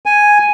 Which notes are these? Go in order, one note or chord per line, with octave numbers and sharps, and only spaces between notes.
G#5